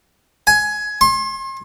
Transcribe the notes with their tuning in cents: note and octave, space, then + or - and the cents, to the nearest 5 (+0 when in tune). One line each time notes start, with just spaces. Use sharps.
G#5 +15
C6 +40